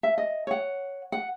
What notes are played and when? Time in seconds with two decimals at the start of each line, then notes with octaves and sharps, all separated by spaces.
0.03 E5
0.18 D#5
0.47 C#5 F#5
1.12 F#5